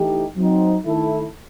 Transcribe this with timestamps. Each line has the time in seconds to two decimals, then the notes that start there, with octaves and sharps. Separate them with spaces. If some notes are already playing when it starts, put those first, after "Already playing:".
Already playing: E3 A3 D#4 G4
0.36 F#3 C4 D#4
0.85 D#3 A3 E4 A4